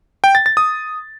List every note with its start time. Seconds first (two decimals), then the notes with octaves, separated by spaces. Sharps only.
0.24 G5
0.35 A6
0.46 A6
0.57 D#6